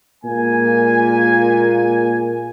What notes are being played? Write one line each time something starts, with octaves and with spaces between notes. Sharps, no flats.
A#2 G#3 A#3 G#5